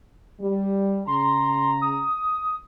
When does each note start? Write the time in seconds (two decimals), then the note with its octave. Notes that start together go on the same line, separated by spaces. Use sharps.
0.40 G3
1.07 C#3 A#5 C6
1.81 D#6